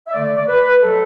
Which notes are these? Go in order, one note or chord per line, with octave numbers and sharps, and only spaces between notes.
E5
D3 A3 D5
D5
B4
B2 F#3 A3 A4